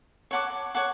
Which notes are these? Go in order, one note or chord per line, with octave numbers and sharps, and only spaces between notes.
C#5 F#5 A5 D6
C#5 F#5 A5 D6